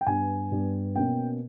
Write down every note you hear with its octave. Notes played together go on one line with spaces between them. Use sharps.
G5
G2 G3 B3 G#5
G2 G3 B3
B2 A#3 C#4 G5